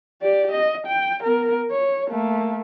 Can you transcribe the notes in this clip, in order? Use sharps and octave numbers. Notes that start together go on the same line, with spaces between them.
G4 D5
D#5
G5
B3 A#4
C#5
A3 A#3